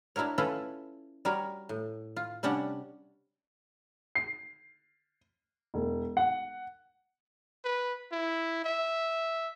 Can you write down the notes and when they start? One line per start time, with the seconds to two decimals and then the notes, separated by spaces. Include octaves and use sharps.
0.16 D4 E4 F#4 A#4 C#5
0.38 C#4 E4 F4 A4 B4
1.25 G3 F#4 A#4 C#5
1.69 A2
2.16 F4
2.43 C3 G3 C#4 D4 F#5
4.15 C7
5.74 E1
6.17 F#5
7.64 B4
8.12 E4
8.65 E5